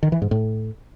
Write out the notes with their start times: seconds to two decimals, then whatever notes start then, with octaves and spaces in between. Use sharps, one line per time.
0.03 D#3
0.12 E3
0.22 G#2
0.31 A2